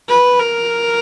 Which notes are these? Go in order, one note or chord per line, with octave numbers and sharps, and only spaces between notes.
B4
A#4